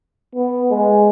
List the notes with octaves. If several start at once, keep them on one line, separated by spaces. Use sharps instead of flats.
B3
G#3